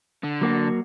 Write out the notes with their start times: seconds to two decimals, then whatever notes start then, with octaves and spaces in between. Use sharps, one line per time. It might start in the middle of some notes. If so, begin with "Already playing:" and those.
0.24 D3
0.41 F#3 A#3 F#4